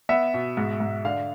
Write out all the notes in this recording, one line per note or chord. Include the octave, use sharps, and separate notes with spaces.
B3 E5
B2
G#2
G#2
D3 F5